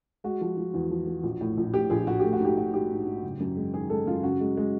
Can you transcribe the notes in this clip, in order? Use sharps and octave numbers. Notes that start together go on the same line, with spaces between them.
G#3 F#4
F3
F3
E2 F#4
F3
F3
A#1
A2
A#1
A2 G4
A#1 G#4
A#1 F#4
A3 G4
F#4
G#2 G4
G#2 F#4
G#2 G4
G#2
G#2
F#1
F#2
G#3
D#3 G#4
G#3 A4
F#2 F4
C#3 F#4
G#3
G#3